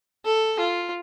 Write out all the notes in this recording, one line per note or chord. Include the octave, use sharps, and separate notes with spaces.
A4
F4